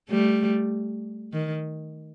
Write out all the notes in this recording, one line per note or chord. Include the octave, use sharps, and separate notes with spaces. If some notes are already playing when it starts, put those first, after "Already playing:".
G3 A3
D#3